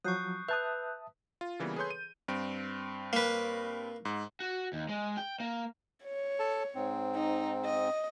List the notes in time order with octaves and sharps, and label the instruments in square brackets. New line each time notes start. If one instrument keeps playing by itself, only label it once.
[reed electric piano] F3 F#3 [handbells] C#6 D#6 [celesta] F#6 G6 C7
[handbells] B4 [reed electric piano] E5 A5 D#6 [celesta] E6 F#6 G6
[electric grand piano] F4
C#3 E3 G3 A#3 B3
G#4 A4 B4 C#5 C6 G6
D#7
G2 C4 D7
[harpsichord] A#3 B4
[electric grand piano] G#2
[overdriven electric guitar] F#4
D#2
G#3
G5
A#3
[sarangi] C#5
[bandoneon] A4 A5
G#2 C4
[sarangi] D#4
D#5